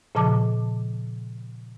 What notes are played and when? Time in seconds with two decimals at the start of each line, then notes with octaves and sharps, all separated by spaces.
0.15 A#2 C#3 F3 A5 D6